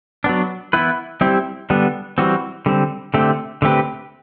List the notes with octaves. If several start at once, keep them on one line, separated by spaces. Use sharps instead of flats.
F#3 B3 D4
E3 B3 E4 B4
G3 C4 E4 G4
D3 G3 B3 D4
E3 G3 C4 F#4
D3 G3 C4
D3 A3 C4 G4
D3 A3 C4 G4 B4